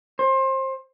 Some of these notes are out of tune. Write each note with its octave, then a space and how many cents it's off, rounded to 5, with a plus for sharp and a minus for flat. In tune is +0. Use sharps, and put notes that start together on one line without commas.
C5 +25